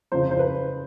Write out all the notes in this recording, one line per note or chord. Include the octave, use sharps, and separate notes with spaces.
F2 C#3 F3 C5
C5
B4